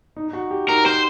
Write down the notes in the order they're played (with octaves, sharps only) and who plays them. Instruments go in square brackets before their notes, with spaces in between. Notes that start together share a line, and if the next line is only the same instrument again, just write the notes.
[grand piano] D#4
D#4
F#4
G4
[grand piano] D#4 [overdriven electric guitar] A#4
[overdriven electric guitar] C5